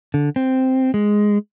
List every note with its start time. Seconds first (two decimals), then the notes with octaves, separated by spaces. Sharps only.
0.14 D3
0.36 C4
0.94 G#3